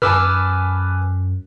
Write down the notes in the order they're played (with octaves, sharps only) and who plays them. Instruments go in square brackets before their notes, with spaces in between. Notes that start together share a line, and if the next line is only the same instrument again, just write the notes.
[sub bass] F#2 [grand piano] B4 G#5 A5 [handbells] D6 E6 F6